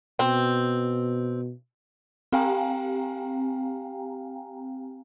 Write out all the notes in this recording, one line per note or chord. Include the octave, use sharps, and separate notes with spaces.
B2 C4
C4 G4 F5 G5 G#5 A#5